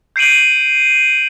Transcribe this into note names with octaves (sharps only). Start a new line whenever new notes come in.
G6 C7 D7 D#7 F#7